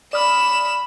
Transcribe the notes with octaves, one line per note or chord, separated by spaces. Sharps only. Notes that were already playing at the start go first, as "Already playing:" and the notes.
D5 B5 D#6 F6 E7